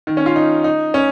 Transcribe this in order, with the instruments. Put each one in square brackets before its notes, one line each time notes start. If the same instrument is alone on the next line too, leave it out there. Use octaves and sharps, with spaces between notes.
[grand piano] D#3
C#4
F4
D#4
D#4
C#4